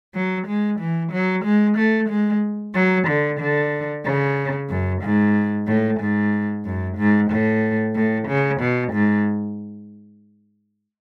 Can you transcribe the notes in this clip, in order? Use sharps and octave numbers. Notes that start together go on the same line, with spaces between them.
F#3
G#3
E3
F#3
G#3
A3
G#3
F#3
D3
D3
C#3
F#2
G#2
A2
G#2
F#2
G#2
A2
A2
C#3
B2
G#2